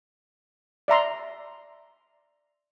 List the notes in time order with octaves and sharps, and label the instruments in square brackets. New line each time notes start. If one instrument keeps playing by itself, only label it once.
[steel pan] D5 E5 A#5 C6